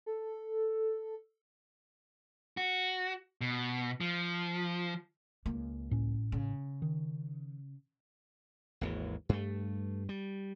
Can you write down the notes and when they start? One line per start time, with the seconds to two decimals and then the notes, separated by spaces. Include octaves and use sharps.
0.06 A4
2.57 F#4
3.41 B2
4.01 F3
5.46 C#2 A#3
5.90 A1 A2 C#4
6.32 C#3
6.82 D#3
8.81 G#1 D#2 E3
9.29 G2 A3
10.09 G3